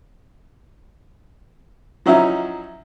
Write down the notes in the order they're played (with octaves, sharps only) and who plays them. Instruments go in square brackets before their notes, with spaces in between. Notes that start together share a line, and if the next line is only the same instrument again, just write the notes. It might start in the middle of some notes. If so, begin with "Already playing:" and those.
[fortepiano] F3 F#3 C#4 D#4 E4